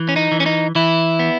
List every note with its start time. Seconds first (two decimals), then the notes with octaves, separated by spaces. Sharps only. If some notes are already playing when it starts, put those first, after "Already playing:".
Already playing: E3
0.09 C#4
0.16 D#4
0.32 E3
0.40 C#4
0.46 D#4
0.75 E3 E4
1.19 B3